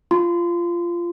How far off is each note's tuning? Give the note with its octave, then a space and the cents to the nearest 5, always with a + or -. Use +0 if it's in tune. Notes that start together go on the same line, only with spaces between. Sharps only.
F4 -15 C6 -25